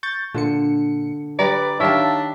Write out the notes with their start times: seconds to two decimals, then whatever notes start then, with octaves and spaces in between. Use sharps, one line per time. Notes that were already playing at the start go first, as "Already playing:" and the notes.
0.03 C#6 G6 A6
0.34 A#2 D3 C5 C#7
1.39 G3 B4 D5 A#5
1.80 D#3 G3 D4 C5 C#5 E5 F5 A5